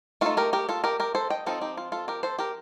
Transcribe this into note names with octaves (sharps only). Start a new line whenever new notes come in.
A3 D#4 F4 A4
G4 A#4
G4 A#4
F4 A4
G4 A#4
G4 A#4
A4 C5
D#5 G5
F3 C4 D#4 F4 A4
D#4 G4
F4
F4 A4
G4 A#4
A4 C5
G4 A#4